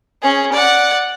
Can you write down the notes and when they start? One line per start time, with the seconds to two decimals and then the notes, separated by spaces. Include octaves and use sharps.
0.22 C#4 G#4
0.52 D5 F#5